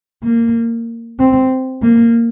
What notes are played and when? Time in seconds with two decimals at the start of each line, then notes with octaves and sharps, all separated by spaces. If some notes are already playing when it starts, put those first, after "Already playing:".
0.24 A#3
1.19 C4
1.82 A#3